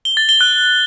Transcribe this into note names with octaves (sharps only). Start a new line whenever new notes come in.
G7
A6
G7
F#6